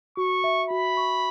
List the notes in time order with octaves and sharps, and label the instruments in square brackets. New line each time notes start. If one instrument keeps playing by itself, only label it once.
[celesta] F#4 [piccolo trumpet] C#6
[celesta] E5
[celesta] F#4 [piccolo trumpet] B5
[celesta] C#6